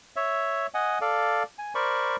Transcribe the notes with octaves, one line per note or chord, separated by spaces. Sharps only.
C#5 E5
D#5 F#5 G#5
A4 D5 F5
G#5
A#4 C5 D5 B5 C#6